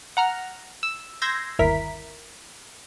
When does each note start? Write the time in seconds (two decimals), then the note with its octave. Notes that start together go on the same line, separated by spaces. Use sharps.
0.17 F#5 A#5 F6
0.83 E6
1.22 C6 E6 G6 G#6 A#6
1.59 G1 D#2 E4 A#4 B6